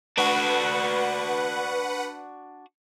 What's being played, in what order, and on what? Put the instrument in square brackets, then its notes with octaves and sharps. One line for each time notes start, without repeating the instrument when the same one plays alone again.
[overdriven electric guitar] D4 F#4 [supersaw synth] B4 F#5